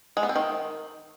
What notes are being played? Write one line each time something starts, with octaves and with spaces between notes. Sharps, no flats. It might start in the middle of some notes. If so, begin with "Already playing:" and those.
G#3
B3
C4
D#3